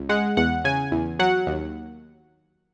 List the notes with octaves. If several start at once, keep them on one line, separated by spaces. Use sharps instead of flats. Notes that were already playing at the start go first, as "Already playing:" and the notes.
Already playing: C#2
G#3 F#5
E2 F#5
C#3 G#5
E2
F#3 F#5
D#2